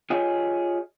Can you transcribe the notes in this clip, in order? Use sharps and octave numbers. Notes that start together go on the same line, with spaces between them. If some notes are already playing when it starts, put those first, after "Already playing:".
F4 G4 G#4 C#5 D#5